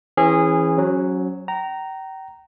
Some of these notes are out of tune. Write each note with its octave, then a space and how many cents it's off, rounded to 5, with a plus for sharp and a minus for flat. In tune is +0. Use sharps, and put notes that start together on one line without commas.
E3 +0 C#4 -30 G#4 -15
F#3 +0 C#4 +0 C5 +45
G5 -35 A#5 -5